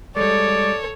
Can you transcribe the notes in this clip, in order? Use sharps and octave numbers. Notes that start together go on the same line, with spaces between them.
G3 G#3 A4 C#5 D5